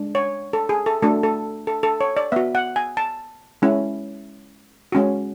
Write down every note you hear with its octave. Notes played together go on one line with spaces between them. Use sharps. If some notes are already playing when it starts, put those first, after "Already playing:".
Already playing: G#3 D4
C#5
A4
G#4
A4
A3 D4 F#4 A4
A4
A4
A4
C#5
D5
B3 F#4 E5
F#5
G#5
A5
G#3 C#4 E4
G#3 C#4 F#4